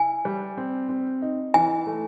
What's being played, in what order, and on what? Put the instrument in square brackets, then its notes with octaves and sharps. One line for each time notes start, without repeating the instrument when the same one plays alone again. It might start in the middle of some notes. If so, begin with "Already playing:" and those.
Already playing: [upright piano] E4 [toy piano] G#5
[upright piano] G3
C4
C4
D#4
[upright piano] E3 [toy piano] G#5
[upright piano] A3